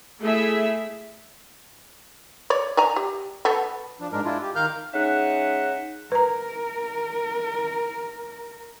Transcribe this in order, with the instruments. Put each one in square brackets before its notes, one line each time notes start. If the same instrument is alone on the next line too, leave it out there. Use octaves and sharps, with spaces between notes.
[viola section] A3 E4 G#4 E5
[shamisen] C#5 D5
D5 G#5 A#5
G4
A3 B3 A4
[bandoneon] F3 D4
G#2 G#3 D4 A#4
G#3 D4 E4 F4
G4
D#3 A#4 F5 F6 G6
[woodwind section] G#3 C#4 D#4 E5 F#5
[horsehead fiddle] A#4 [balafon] B4 A#5